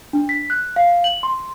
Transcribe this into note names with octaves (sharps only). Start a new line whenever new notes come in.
D4
B6
F#6
F5
F#7
C6